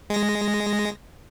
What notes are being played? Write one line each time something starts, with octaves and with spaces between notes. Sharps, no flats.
G#3 A#6